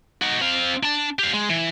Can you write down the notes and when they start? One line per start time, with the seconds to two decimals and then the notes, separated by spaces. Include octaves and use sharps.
0.22 D#4 F#4
0.41 C4 F5
0.83 D4 A5
1.19 G4 F5
1.33 G#3
1.50 E3